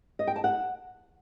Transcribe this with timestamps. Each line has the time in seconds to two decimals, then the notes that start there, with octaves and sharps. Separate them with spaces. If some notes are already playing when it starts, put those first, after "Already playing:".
0.19 D#5
0.27 G5
0.36 A5
0.44 F#5